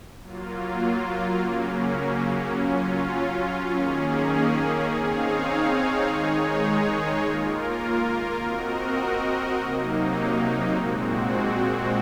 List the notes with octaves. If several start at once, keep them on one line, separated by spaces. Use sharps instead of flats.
F#3 A#3 F4
C#3 F#3 A#3 C#4
F#3 C#4 F4
D#3 A#3 C#4 G#4
C4 D#4 G#4 C#5 F5
D#3 G#3 D#4 G#4 C#5
A#3 F4 A#4
C4 F#4 A#4 D#5
C3 F#3 A#3 D#4
A#2 G#3 C4 F#4